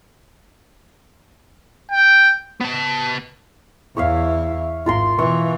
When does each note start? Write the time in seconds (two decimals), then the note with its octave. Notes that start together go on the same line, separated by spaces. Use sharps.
1.91 G5
2.61 B3 A5
3.97 E2 E4 C#5 E5 F5
4.86 G#1 F4 A#4 C6
5.18 B2 E3 C#6